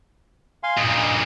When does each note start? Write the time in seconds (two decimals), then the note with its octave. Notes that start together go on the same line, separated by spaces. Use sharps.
0.63 F5 G#5 C6
0.77 G2 A#2 D#5